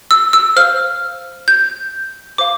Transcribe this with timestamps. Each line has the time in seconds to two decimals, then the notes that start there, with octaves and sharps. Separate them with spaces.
0.11 E6
0.33 E6
0.56 C5 F5 F6
1.48 G6
2.38 C5 F5 D6